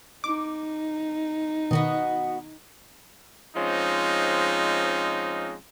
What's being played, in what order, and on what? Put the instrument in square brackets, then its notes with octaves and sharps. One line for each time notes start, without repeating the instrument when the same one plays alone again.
[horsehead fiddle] D#4 [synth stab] D6
[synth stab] B2 D#3 [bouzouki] B3 F#4 D#5
[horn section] F3 G#3 C4 C#4 D#4